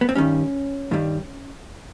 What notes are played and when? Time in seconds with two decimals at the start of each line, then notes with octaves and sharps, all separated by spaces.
0.01 B3
0.09 C4
0.15 G2 D#3 G3 C#4
0.91 G2 D#3 G3